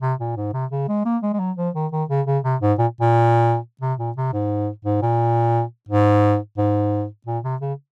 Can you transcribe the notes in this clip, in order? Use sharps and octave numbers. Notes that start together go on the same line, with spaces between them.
C3
A#2
G#2
C3
C#3
G#3
A#3
G#3
G#3
F#3
F3
D#3
D#3
C#3
C#3
C3
G#2
A#2
A#2
C3
A#2
C3
G#2
G#2
A#2
G#2
G#2
A#2
C3
C#3